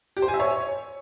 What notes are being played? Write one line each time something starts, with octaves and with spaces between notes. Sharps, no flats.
G4
C5
G#5
E5
C#5